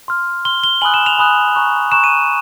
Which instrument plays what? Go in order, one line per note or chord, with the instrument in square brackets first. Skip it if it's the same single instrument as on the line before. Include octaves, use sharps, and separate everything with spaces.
[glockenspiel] C6 F6
C6 F6 G7
G7
G#5 B5 D#6 F#6 F#7
E7
F7
G#5 B5 D#6 F#6
A#5 C#6 F#6
A#5 C#6 F#6 E7
D#7